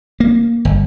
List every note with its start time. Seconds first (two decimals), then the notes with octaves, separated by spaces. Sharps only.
0.20 A#3
0.65 G1